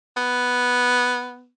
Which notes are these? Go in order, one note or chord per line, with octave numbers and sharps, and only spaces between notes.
B3